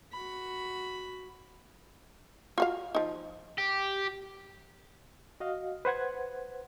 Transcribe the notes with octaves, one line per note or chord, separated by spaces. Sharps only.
F#4 B5
F4 F#4 F5
F3 D#4
G4
F#4 D#5 F5
B4 C5 F#5 G#6